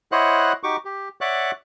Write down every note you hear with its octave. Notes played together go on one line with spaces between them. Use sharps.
E4 C5 C#5 D#5 F#5 F#6
D#4 F#4 G4 C#6 D6
G4
C#5 D5 E5 F#5 D6 F#6